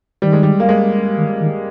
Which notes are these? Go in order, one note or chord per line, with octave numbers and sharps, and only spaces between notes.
D#3 G3
G#3
G3
A#3
G#3
D#3
D#3